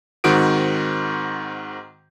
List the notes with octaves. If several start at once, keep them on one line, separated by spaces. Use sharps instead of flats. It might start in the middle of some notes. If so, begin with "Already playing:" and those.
G#2 D#3 C4 F#4 D#6 D7